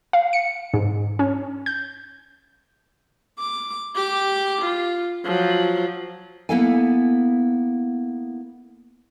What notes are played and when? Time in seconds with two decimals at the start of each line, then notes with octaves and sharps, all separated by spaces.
0.13 F5
0.33 C#7
0.74 G#2
1.19 C#4
1.66 G6
3.39 D6
3.95 G4 D6
4.62 F4
5.25 F3 F#3
6.49 A#3 B3 E4 A4 F5 G#5